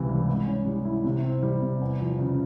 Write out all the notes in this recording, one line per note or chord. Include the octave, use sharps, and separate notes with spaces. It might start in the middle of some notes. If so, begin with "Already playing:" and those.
Already playing: C#2 C3 E3
G3
G#2
C#4
G3
E4
C3
C4
G3
C3
E2
F3
C#3